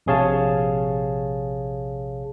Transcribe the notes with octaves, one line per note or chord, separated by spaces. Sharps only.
A#1 C3 G#4 C#5 F5 A5